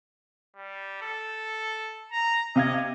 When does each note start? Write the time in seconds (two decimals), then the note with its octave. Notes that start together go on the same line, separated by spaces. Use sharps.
0.56 G3
1.02 A4
2.12 A#5
2.56 C3 D#5 F5 G#6